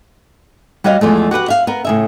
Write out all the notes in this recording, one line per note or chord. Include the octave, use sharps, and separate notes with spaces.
G3 F#4 C#5 D#5 F5
E2 F3 G#3 A3
F#4 G4 B4 F#5
E5 F5
B3 A#4
A2 C#3 E5